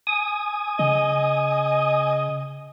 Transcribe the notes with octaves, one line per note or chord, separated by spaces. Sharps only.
G#5 D#6
C#3 D#5